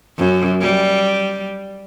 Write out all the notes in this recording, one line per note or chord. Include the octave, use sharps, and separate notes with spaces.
F#2
G3